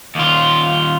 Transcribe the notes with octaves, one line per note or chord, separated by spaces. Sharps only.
D#2 F4